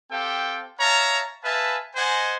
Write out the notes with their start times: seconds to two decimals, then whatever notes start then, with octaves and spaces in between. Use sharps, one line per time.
0.11 C4 G4 A4 F5 G5
0.80 C#5 E5 F5 A5 A#5
1.44 B4 E5 F5 G#5 A5
1.96 C5 D#5 F#5 G#5